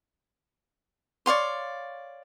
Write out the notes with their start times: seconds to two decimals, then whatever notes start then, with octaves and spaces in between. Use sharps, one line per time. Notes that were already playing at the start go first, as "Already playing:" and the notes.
1.26 C#5 D5 F5 C6